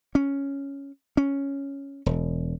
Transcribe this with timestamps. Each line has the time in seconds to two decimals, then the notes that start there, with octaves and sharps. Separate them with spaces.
0.15 C#4
1.17 C#4
2.06 E1